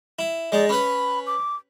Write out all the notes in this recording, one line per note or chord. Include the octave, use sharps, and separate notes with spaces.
E4
G#3 D#4 D5
C#4 B4 B5
D6